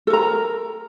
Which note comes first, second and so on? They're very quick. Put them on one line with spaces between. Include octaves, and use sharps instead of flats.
A4 A#4 A#5